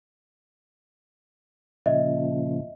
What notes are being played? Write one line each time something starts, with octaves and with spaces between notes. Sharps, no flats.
A#2 C#3 F3 D#5 E5